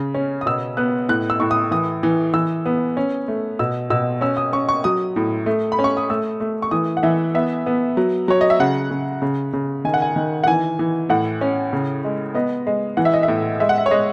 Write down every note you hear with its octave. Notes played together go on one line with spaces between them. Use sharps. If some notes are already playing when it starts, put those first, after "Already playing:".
Already playing: C#3
C#4
D#6
B2 E6
B3 F#6
A2 F#6
E6
A2 C#6
D#6
E3 D#6
E3
E3 E6
B3
C#4
A3
B2 E6
B2 E6
C#4 E6
D#6
C#4 C#6
C#6
F#3 D#6
A2
A3
B5
C#4
C#6
D#6
A3 E6
A3
C#6
E3 D#6
F#5
E3 E5
B3 E5
B3
F#3
F#3 C#5
D#5
E5
C#3 F#5
C#3
C#3
C#3
D#3 G#5
F#5
G#5
D#3
F#5
E3 G#5
E3
A2 F#5
C#4
C#3
G#3
B3 D#5
G#3
E3 F#5
E5
D#5
E5
A2
G#3 E5
F#5
E5
C#5
G#3 D#5